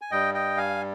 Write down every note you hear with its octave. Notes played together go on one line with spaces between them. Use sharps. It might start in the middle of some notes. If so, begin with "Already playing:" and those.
G#5
G2 G3 D#5 G5
D#5 G5
F5 G#5